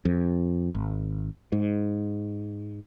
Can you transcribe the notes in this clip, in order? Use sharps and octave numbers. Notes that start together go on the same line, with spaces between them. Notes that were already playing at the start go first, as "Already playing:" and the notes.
F2
G#1
G#2